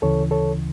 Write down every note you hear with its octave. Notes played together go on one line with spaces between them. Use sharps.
D2 C#3 E3 A4 C#5
A4 C#5